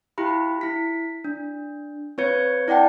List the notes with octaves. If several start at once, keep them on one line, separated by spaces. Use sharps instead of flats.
E4 F4 G4 B5
E4 B6
D4
C4 F4 B4 C#5 G#6 C#7
E4 D5 F#5 G5 A5